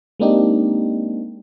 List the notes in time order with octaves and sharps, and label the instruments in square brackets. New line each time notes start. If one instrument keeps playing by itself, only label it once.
[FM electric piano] G#3 A#3 C4 D4 D#4 G4